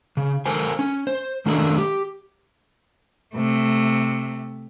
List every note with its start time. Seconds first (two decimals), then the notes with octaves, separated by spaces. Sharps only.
0.17 C#3
0.46 A4 A#4 C5 G#5
0.79 C#4
1.07 C5
1.46 D#3 A3 C#4 D4 A4 A#4
1.78 G4
3.34 C3 A3